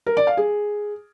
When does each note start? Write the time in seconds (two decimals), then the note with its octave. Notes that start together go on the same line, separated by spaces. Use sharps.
0.06 A#4
0.17 D5
0.27 F5
0.37 G#4